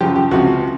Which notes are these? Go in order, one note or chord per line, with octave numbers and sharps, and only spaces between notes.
F#2 C#3 F3 G4
G4
C#2 C3 F3 F#4